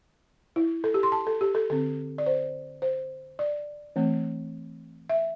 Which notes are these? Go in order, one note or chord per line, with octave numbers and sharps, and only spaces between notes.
E4
A4
G4
C6
A5
A4
G4
A4
D3 C4 A4
D5
C5
C5
D5
E3 A3 C4
E5